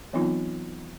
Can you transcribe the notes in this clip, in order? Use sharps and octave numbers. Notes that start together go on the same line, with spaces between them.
E3 F#3 B3 C4 D#4 F4